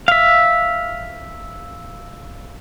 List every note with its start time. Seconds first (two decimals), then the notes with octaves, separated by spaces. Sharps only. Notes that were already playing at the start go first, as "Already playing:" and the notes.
0.08 E5 F5